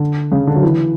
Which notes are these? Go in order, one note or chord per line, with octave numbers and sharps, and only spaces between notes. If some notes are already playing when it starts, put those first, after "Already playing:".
Already playing: D3
C#3
D3
F#3
E3